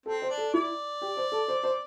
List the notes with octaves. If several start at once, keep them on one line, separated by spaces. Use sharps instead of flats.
C4 A4
C5
D4
A4
E4 D5
G4
C5
A4
C5
C5